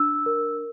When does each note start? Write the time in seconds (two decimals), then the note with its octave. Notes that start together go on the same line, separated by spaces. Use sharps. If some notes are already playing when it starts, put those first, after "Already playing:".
Already playing: D4 E6
0.26 A#4